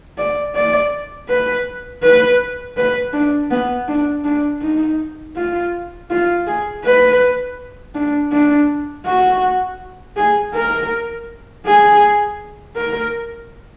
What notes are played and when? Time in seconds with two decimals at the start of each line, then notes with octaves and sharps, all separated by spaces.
0.18 D5
0.55 D5
1.28 B4
2.03 B4
2.77 B4
3.13 D4
3.51 B3
3.88 D4
4.25 D4
4.62 D#4
5.36 F4
6.10 F4
6.47 G#4
6.84 B4
7.95 D4
8.32 D4
9.06 F#4
10.17 G#4
10.54 A#4
11.65 G#4
12.76 A#4